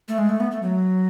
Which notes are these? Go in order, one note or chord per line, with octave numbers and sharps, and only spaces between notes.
A3
G#3
A3
B3
A3
F#3